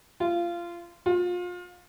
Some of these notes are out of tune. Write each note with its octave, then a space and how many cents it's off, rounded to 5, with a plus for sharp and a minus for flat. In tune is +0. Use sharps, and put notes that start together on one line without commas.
F4 -20
F4 +30